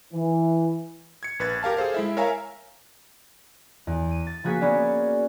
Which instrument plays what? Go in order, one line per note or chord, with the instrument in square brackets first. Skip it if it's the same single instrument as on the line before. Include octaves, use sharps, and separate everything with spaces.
[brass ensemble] E3
[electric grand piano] G#6 C#7
A#1 B4 G#6 A6
G4 A#4 F5 A5
G#4 A4 C5 F5
G#3 E4 E5
A#4 C#5 E5 F5 G#5 A#5
[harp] E2
D#7
A6
F3 A#3 F#4 G#4 B6
A#3 B3 C#4 D5